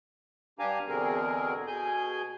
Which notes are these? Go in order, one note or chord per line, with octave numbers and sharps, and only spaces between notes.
G2 D4 G4 F5 G#5 A#5
E2 B2 D3 C4 G#4 A#4
B2 G#4 G#5 G6